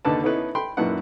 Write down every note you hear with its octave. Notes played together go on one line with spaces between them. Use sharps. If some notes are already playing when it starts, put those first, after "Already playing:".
D#2 D3 A4 B4 A5
B3 C#4 D#4 E4 B4
G5 B5 C6
G#1 F#2 A#2 E4 B4 F#5